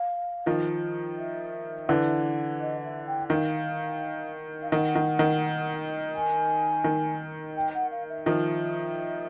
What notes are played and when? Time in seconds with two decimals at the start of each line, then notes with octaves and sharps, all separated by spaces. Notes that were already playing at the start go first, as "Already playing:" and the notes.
Already playing: F5
0.46 D#3 F3
1.18 E5
1.89 D3 E3
2.60 D#5
2.84 E5
3.06 G5
3.30 D#3 F5
4.62 F5
4.72 D#3 F#5
4.95 D#3
5.19 D#3
6.14 G#5
6.84 D#3
7.56 G5
7.74 F#5
7.91 F5
8.09 E5
8.26 D#3 F3 E5